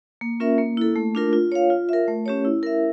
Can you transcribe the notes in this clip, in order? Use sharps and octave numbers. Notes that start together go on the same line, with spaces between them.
A#3
C#4 F4 A#4 E5
A#3
E4 A4
A3
D4 F4 A#4
F4
C#5 F5
F4
A#4 E5
A3
C#4 G4 C#5
E4
A#4 E5